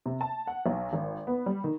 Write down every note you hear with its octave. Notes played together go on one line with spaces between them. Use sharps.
C3
A5
F#5
B1
G#1
B3
G3
D#3